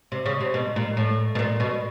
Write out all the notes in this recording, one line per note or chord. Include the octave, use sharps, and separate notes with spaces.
C3
C#3
C3
B2
A#2
A2
B2
A#2
B2